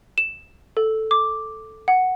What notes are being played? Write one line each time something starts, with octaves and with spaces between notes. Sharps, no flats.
E7
A4
D6
F#5